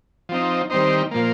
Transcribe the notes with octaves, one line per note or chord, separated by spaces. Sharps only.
F3 C4 D#4
D#3 G3 C4 D#4 C5
A#2 F3 A#3